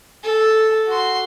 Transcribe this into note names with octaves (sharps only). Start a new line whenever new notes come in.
A4
F#4 C6